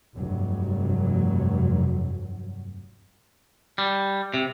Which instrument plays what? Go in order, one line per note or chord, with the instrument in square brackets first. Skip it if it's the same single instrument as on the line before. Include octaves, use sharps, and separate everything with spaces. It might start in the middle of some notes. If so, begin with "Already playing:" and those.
[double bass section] F1 G2 F#3
[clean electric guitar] G3
C3